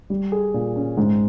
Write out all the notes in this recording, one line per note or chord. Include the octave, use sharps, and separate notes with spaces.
G3
G#4
A#2
C#4
G#2